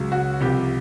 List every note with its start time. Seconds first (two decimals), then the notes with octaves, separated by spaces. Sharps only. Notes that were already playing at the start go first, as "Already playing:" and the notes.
Already playing: C#2 C#3 F#3
0.12 F#4
0.41 C2 C3 F3 G4